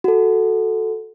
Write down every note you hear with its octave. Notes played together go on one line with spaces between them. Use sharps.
F#4 A4